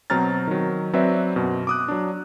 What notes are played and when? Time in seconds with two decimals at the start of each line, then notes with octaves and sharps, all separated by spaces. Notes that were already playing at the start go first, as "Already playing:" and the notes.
0.10 B2 F#3 C4 A#5 F6 A6
0.47 D#3 F#3
0.93 F#3 C4 B4 D5 E5
1.36 F#2 B2
1.67 D6 D#6 F#6
1.88 F#3 D4